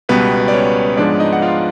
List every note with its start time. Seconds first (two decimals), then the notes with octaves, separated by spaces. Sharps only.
0.09 C#2 B2 G3 B3 B4
0.48 D5
0.53 C#4 C#5
0.97 G#2 F3 G#3 B3 D4 D5
1.20 D#4 D#5
1.33 F#5
1.42 F4 F5